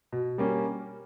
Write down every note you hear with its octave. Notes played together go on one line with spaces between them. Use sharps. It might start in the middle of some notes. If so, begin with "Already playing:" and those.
B2
G3 A#3 C#4